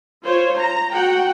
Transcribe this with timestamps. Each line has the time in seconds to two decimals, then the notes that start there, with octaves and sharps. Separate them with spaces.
0.24 F4 C5 C#5
0.57 A#5
0.94 F#4 F#5 G5